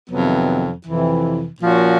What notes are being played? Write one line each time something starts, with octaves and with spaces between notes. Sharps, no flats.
F2 C3 D#3 F#3 B3
F2 C3 E3
A#2 F3 A#3 C#4 F#4